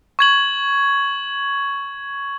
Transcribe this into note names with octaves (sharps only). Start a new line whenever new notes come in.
C#6 G#6 F#7